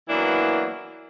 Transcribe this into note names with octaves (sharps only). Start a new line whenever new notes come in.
E3 F#3 A#3 B3 D4 E4